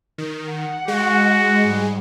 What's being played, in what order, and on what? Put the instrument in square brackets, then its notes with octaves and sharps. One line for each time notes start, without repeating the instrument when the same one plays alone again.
[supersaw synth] D#3
[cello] F#5
[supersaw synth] G#3 [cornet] F#4
[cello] G#2 G3